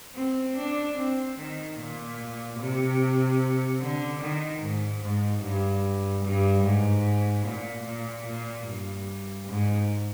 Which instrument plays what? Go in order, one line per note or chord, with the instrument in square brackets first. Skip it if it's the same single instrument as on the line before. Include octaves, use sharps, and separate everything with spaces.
[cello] C4
D4
C4
D#3
A#2
C3
D3
D#3
G#2
G#2
G2
G2
G#2
A#2
A#2
A#2
G2
G#2